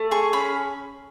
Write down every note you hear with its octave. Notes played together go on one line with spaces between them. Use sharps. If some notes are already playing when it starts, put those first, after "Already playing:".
Already playing: A3
G#4 C#6
C#4 B5